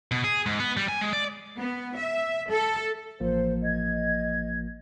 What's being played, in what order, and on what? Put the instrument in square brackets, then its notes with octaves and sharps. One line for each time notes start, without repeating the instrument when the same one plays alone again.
[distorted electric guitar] B2
G#4
G#2
B3
G3
G#5
G#3
D5
[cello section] B3
E5
A4
[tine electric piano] A1 F3 A#3 [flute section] C5
[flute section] D#5 G#6